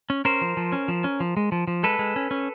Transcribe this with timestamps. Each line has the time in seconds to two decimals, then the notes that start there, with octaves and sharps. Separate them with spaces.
0.10 C#4
0.25 C#4 A#4 C5
0.42 F3
0.57 F3
0.72 C#4
0.88 F3
1.04 C#4
1.20 F3
1.37 G#3
1.52 F3
1.68 F3
1.83 G#3 A4 B4
1.99 G#3
2.16 C#4
2.31 C#4